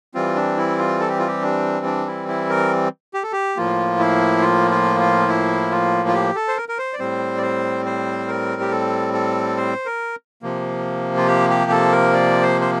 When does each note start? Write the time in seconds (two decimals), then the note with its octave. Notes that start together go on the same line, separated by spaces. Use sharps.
0.15 E3 G3 C4 F4
0.36 D4
0.57 E4
0.78 F4
1.00 A4
1.09 G4
1.19 F4
1.28 G4
1.42 D4
1.85 D4
2.07 E4
2.28 E4
2.50 A#4
3.14 G4
3.23 A4
3.32 G4
3.57 A2 F3 A#3 F4
3.99 E4
4.42 F4
4.71 F4
5.00 F4
5.28 E4
5.71 F4
6.08 F4
6.14 G4
6.36 A4
6.48 C5
6.57 A#4
6.69 A#4
6.78 C5
6.93 D5
6.99 A2 G3 C4 C5
7.37 D5
7.43 C5
7.86 C5
8.28 A#4
8.61 G4
8.71 A4
9.14 A4
9.57 C5
9.86 A#4
10.42 C3 F3 A#3
11.17 F4
11.28 G4
11.50 G4
11.71 A4
11.92 A#4
12.14 D5
12.42 C5
12.61 C5